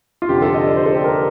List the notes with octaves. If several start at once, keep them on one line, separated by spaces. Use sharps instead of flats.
F4
F1 F2 D3 G4
A4
D#5
D5
C5
A4
G4
A#4